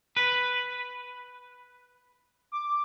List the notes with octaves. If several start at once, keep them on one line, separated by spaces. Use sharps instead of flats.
B4
D6